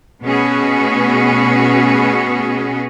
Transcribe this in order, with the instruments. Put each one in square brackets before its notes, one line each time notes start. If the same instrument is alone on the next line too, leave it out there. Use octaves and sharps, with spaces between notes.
[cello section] B2 A3 B3 C#4 F#4 G#4